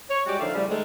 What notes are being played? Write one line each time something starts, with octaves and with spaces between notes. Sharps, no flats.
C#5
G3 G#3 C#4 F#4 G4 D5
D3 D#3 F3 A3 F5
A2 C#3 F3 G3
D#3 G#3 A3